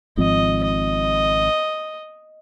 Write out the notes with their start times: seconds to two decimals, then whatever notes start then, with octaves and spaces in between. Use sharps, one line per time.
0.17 G#1 G#2 F3 C4 D#5
0.64 D#5